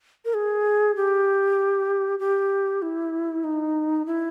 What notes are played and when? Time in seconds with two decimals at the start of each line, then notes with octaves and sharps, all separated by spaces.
0.25 A#4
0.34 G#4
0.96 G4
2.19 G4
2.82 E4
3.44 D#4
4.06 E4